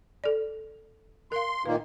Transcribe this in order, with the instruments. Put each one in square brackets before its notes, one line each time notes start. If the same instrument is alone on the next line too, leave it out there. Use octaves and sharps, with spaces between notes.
[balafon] A4 D5
[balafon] A#4 F5 [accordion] C6
[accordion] A#2 D#3 A#3 [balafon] B4